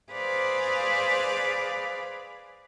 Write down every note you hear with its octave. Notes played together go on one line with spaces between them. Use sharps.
G#4 B4 C5 D5 F5